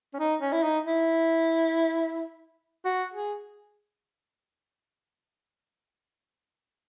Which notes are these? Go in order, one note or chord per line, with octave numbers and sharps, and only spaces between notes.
C#4
D#4
C#4
E4
D#4
E4
F#4
G#4